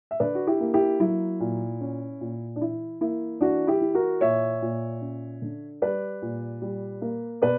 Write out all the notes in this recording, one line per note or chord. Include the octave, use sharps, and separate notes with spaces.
E5
D3 B4 D5
F#4
E4 G4
A#3
E4 G4
F#3 E4
A#2
C#4
A#2
D4
E3 E4
A#3 E4
E3 D4 F#4
E4 G4
E3
F#4 A#4
A#2 C#5 E5
A#2
C#4
D3
G3 B4 D5
A#2
G3
A#3
B2 B4 D5